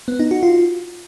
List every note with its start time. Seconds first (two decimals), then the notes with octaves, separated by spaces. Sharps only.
0.08 B3
0.19 D#4
0.31 F#4
0.43 F4